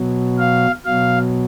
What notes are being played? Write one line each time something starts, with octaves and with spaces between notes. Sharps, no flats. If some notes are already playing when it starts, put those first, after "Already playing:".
Already playing: B2 F#3
F5
B2 F#3 F5